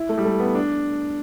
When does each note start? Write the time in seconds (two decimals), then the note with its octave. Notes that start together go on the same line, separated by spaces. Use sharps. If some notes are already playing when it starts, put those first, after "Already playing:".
Already playing: E4
0.09 A3
0.18 G3
0.25 A3
0.39 B3
0.55 D4